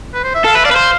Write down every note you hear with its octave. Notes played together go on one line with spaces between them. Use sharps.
B4
C5
E5
A4 F5
B4 E5
D5 F5
B4
C5